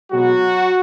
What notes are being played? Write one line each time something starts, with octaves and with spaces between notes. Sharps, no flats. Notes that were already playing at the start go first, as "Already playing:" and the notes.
B2 F#3 G#3 B3 F#4